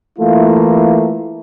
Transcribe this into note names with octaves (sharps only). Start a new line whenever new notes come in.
E3 A3 A#3 E4 F4